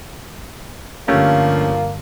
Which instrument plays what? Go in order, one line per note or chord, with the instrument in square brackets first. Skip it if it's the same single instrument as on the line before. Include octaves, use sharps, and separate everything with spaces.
[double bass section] G2 D3 [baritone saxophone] F3 [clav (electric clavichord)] A3 C#4 G4 [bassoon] A#3